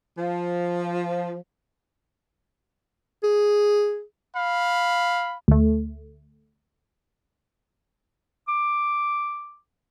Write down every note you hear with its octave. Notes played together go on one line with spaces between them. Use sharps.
F3
G#4
F5 B5
D2 A3
D6